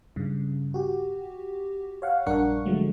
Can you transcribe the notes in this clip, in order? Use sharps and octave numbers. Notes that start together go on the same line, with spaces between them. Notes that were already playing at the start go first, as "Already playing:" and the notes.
G2 C#3
F#4 G4
C#5 F5 F#5
A#1 G2 D4 A#4 F#5 C#6
D3 F3 F#3 G#3 A3